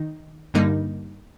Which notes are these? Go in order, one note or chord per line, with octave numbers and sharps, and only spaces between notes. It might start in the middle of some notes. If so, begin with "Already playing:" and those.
Already playing: D#3 D#4
G2 D3 G3 A#3 D#4